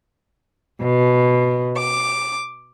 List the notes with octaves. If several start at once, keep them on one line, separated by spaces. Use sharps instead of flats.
B2
D6